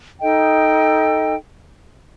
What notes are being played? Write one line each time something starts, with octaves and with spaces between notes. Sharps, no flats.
D#4 A4 D#5 G5